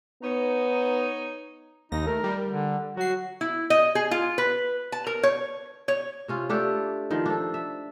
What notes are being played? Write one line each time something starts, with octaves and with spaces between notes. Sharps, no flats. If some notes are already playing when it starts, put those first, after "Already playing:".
B3 D#4 C#5
D#2 D#4 A#6
A3 A#4
G3
D3
F#3 F#4 C7
E4
D#5
G#4
F4
B4
A5
A#4
C#5
C#5
C3 C#4 F4
A3 D4 G4 A4
D#3 F3
D4 A4
E5